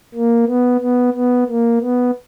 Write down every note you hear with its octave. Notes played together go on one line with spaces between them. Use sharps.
A#3
B3
B3
B3
A#3
B3